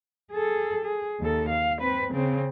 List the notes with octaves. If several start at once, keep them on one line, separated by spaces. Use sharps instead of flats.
G#4 A4
G#4
D#2 A4
F5
C4 B4
C#3 C4